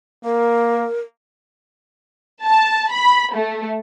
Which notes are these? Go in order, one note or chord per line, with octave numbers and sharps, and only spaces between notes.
A#3 A#4
A5
B5
A3